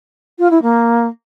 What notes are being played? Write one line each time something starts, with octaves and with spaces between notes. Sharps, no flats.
F4
E4
A#3